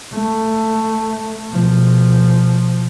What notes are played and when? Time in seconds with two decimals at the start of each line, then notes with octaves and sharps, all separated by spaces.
0.14 A3
1.49 B2 F3